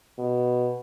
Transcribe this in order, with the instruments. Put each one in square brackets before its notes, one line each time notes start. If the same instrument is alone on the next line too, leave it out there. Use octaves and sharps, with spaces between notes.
[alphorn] B2